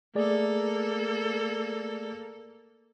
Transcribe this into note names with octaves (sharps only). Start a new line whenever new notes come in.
A3 A#3 G#4 A4 D5